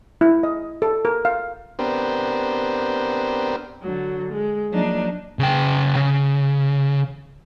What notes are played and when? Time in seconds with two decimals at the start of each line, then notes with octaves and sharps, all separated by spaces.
0.21 E4
0.43 D#5
0.82 A4
1.05 A#4
1.25 F5
1.79 B3 C4 D4 G4 A#4 C5
3.82 D3 F#3
4.33 G#3
4.71 F3 F#3 A#3 D4 D#4
5.39 C#3 G5
5.96 C#3